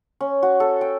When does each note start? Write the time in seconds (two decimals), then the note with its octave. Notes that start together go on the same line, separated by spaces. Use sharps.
0.21 C#4
0.43 F#4
0.60 A4
0.81 G5